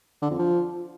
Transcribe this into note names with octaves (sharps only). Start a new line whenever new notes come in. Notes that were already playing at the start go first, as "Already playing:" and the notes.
D3
F2
F3